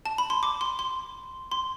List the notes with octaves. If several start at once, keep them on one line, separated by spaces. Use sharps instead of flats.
A5
B5
C6
D6
C6
C6
C6